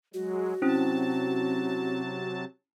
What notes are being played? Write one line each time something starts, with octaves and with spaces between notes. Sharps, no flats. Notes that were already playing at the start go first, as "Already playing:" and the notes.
F#3 G#3 F#4
C3 F#3 C4 C#4 E4 A5